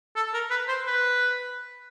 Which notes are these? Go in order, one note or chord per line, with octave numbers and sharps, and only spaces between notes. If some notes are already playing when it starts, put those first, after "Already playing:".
A4
A#4
B4
C5
B4